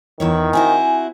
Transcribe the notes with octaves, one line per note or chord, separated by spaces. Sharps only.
E2 D#3 E4 C#5
C4 E4 F#4 G#5